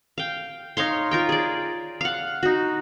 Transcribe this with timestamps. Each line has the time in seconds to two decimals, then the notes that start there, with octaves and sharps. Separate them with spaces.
0.18 F5 G5
0.77 D#4 C#5 F5 C6
1.11 F4 A#4 G5
1.29 G#4 D5
2.01 F5 F#5
2.43 D#4 F#4